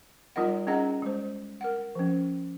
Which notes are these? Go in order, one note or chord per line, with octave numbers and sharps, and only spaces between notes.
G3 D#4 F4 A#4 D#5 F#5
C#4 D#4 G#4 D#5 F#5 A#5
G#3 C5
A#4 F#5
F3 C#4